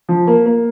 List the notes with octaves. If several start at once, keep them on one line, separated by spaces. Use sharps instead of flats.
F3
A#3
A#3